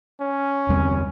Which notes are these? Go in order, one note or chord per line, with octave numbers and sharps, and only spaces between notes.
C#4
E2 G3 C4